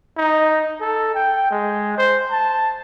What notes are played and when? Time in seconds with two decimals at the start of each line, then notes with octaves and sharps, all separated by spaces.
0.17 D#4
0.81 A4
1.15 G5
1.51 G#3
1.98 C5
2.30 A5